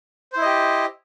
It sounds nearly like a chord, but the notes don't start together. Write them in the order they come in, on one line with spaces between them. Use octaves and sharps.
C5 E4 D#5 G4